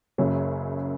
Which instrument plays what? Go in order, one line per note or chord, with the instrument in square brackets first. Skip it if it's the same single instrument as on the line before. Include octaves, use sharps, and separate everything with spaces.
[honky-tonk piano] F#1 F#2 C#3 F#3